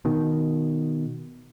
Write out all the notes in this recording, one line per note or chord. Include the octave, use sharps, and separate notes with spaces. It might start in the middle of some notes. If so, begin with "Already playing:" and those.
B2 D#3